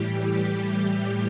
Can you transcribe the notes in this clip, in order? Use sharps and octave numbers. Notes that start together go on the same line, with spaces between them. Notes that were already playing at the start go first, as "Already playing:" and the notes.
Already playing: A2 E3 G3 G4